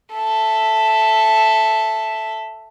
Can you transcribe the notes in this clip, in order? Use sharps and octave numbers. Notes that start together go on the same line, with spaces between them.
A4 E5